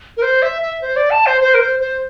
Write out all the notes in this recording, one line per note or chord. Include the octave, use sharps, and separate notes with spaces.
A#4
C5
E5
E5
C5
D5
A5
C5
C5
A#4
C5
C5